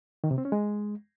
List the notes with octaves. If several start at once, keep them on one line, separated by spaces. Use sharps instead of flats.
D#3
C3
C4
C#4
G#3